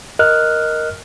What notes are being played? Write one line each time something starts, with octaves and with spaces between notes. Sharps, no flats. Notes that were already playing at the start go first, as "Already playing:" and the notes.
A#4 D#5 F6 F#6